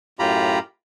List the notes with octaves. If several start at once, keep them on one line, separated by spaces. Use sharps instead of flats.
F#2 A2 F4 G4 A#5 B5